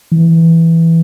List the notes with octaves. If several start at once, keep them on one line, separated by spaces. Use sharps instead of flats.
E3